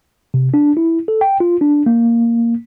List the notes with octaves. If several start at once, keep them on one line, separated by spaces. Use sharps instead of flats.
C3
D4
E4
A4
G5
F4
D4
A#3